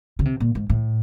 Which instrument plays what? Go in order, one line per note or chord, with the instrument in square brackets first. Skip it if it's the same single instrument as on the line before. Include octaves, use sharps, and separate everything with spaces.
[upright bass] C#3
C3
A#2
G#2
A2